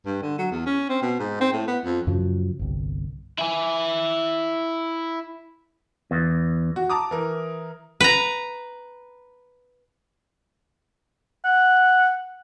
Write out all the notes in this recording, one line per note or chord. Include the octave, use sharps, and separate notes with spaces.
G2
D3
F#3
E2
C#4
C4
B2
G#2
C4
A2
B3
F2
F#2 C#3 F3 F#3
G1 C2
E4 G#5
E2
F#4
A5 A#5 D6 D#6
E3 A#4
B4 A#5
F#5